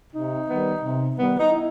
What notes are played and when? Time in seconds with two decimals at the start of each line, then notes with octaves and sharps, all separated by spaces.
0.12 C3 D#4
0.47 D#3 G3 B3
0.81 C3
1.15 D#3 G3 B3
1.38 D#4
1.50 E4